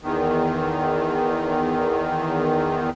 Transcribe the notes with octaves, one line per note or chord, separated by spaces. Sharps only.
E2 D#3